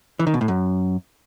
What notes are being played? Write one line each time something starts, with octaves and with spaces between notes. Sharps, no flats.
E3
D#3
B2
A2
F#2